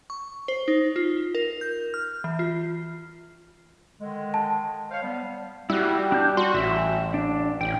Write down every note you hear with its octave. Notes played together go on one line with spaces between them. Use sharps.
C#6
C5
D#4
F4
A#4
G6
F6
E3
F4
D3 D#3 G#3
A5
C5 C#5 F5
G3 B3
G3 E4 F#4
D4 A5 G6
F#4 C6
A1 E5
D4
A1 G5